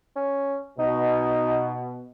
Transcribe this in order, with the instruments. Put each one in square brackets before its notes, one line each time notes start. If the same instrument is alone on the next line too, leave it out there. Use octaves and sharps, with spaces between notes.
[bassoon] C#4
[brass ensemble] B2 [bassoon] D#4